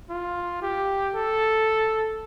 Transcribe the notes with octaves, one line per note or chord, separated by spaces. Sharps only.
F4
G4
A4